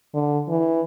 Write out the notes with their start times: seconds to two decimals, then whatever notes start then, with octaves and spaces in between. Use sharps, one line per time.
0.14 D3
0.48 E3